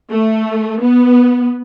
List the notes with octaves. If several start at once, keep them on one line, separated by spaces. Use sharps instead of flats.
A3
B3